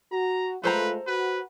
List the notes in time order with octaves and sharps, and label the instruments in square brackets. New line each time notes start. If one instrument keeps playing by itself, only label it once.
[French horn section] F#4 [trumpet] A#5
[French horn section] G#3 A3 F4 [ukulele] A4 C5 A#5 [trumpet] B4
[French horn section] F#4 [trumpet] B4